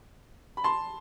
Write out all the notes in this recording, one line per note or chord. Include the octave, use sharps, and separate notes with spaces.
B5
A5 C6